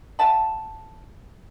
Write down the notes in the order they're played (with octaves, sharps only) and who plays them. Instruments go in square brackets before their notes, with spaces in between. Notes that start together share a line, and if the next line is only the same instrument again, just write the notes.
[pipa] E5 F#5 A5 B5